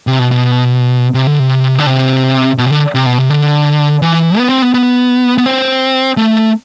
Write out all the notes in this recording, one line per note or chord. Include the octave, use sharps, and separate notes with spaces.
C3
B2
B2
C3
D3
C3
D3
C3
B2
C3
D3
C3
B2
C3
D3
E3
B3
C4
B3
B3
B3
C4
A3